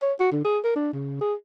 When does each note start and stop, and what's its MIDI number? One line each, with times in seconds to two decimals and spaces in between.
0.02 0.13 73
0.20 0.29 66
0.32 0.42 50
0.45 0.59 68
0.64 0.75 70
0.76 0.90 62
0.93 1.18 49
1.21 1.34 68